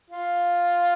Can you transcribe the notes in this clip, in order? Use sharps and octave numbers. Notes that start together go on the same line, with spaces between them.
F4